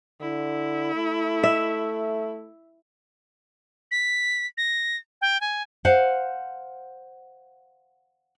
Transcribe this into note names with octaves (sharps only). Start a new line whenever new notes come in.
D3 E4
A3
E5
B6
A#6
G5
G#5
C5 F5 F#5